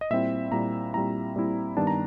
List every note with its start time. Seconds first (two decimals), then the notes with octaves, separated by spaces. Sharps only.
0.01 D#5
0.10 A#2 G3 C4 E4 E5
0.52 A#2 G3 C4 E4 A#5
0.94 A#2 G3 C4 E4 A#5
1.36 A#2 G3 C4 E4
1.77 G2 D#3 G3 B3 D4 A5
1.87 A#5